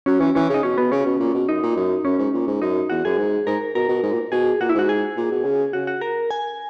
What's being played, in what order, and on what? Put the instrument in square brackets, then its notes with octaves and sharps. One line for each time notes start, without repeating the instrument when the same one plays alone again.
[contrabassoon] F#3 [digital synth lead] C#4
[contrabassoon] E3 [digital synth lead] C#4
[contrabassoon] E3 [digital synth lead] C#4
[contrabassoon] C#3 [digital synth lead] D#4
[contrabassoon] B2 [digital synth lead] C#4
[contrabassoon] B2 [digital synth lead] B3
[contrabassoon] C#3 [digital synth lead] C#4
[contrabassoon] B2
A#2
B2
[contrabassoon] F#2 [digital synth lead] D#4
[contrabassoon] A#2
F#2
[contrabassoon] F#2 [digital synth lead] C#4
[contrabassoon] G#2
A#2
G#2
[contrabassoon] F#2 [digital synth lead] D#4
[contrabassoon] E2 [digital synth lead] F#4
[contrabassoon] F#2 [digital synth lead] G#4
[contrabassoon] G#2
[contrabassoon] G#2 [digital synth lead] A#4
[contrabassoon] B2 [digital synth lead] A#4
[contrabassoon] B2
G#2
A#2
[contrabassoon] B2 [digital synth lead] G#4
[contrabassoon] A#2 [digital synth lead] F#4
[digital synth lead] E4
[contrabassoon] G#2 [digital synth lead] F#4
[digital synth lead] G#4
[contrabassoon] A#2
B2
C#3
[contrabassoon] C#3 [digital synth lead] F#4
[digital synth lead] F#4
A#4
G#5